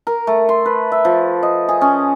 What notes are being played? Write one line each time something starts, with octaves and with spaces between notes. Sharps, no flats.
A#4
A3
C6
B4
E5
F3
D#5
G#4
C#4